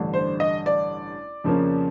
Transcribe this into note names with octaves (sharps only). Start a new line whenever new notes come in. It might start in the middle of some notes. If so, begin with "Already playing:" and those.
Already playing: A1 G2 D3 G3
C5
D#5
D5
F2 C#3 F3 A#3 C#4